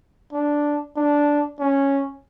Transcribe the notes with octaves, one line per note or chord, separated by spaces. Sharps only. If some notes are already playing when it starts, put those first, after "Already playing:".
D4
D4
C#4